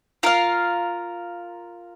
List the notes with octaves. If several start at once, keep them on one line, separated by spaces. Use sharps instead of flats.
F4 A#4 F5